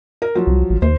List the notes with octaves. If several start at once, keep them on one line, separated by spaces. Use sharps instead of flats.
A#4
F3 F#3
C2
A1
D#2 C5